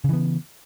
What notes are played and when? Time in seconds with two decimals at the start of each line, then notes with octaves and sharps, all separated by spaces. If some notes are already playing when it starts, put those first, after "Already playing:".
0.04 C#3
0.09 E3
0.13 B3